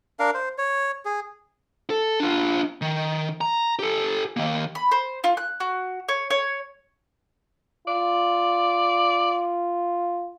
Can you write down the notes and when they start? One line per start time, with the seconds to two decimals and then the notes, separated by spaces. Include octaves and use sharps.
0.19 D4 A#4 F5
0.34 C5
0.58 C#5
1.05 G#4
1.90 A4
2.20 D4 F4
2.82 D#3
3.41 A#5
3.79 G4 A4
4.37 D#3 A#3
4.75 B5
4.91 C5
5.24 F4
5.37 F#6
5.60 F#4
6.09 C#5
6.30 C#5
7.87 F4 D5